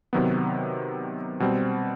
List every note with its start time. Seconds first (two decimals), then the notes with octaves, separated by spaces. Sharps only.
0.13 C3 D#3 F#3 B3
1.40 B2 G3 C4